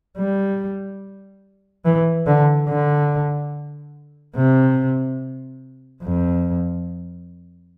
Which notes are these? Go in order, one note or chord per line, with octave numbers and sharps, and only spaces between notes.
G3
E3
D3
D3
C3
F2